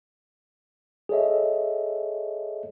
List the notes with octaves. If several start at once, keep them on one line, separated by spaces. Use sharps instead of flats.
G#4 A4 C#5 D#5 E5